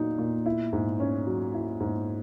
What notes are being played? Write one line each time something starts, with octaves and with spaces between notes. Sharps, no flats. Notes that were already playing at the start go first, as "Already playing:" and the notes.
Already playing: A#2 F#3 D#4
A#2
E4
G#2
C#4
F#3
E4
G#2